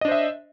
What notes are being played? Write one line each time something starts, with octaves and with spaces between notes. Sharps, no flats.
D4 C5 D#5 E5